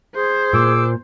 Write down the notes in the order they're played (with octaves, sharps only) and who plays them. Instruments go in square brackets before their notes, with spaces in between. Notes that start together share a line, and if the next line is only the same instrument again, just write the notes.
[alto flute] G#4 [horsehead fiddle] C5
[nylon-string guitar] A#2 [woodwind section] D6 E6